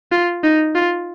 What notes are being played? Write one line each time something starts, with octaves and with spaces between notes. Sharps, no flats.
F4
D#4
F4